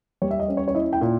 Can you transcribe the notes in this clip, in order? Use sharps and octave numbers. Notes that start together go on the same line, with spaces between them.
G3 C#5
E5
D#5
C#4
C#5
C#5
E4 D#5
G5
A#2